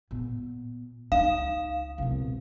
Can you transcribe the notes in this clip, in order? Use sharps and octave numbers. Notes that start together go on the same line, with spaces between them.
A#2 B3
C#2 D#4 F5
C2 B2